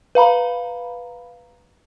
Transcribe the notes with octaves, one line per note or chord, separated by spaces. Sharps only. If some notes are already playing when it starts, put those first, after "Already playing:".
B4 F5 A#5 B5